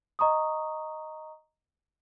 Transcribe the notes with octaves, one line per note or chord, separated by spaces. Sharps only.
D#5 A#5 C#6 D#6